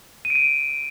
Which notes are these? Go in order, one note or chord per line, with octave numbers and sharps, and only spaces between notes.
D#7
D7
D#7